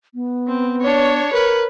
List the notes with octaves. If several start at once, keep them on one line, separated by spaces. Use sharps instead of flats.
B3
C4
D4 C#5
A#4 B4